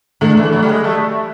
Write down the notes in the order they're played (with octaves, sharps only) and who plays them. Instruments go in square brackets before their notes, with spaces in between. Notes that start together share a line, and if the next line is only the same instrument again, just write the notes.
[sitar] D3 [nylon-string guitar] A3
[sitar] E3
F#3
G3
G#3
A3